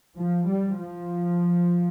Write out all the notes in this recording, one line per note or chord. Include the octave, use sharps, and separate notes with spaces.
F3
G3
F3